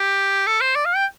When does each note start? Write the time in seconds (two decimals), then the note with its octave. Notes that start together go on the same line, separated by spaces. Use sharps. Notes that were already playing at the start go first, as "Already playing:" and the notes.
Already playing: G4
0.47 A4
0.61 C5
0.75 D5
0.85 F5
0.96 G5